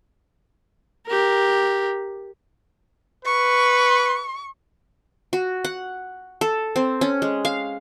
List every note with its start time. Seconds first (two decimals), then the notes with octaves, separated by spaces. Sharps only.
1.06 G4 A#4
3.25 B4 C#6
5.33 F#4
5.65 F#5
6.41 A4
6.76 C4
7.01 C#4
7.22 G#3
7.45 F5